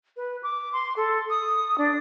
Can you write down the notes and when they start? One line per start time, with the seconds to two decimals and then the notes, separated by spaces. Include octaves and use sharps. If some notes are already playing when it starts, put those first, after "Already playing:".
0.16 B4
0.43 D6
0.73 C6
0.96 A4
1.29 D#6
1.78 D4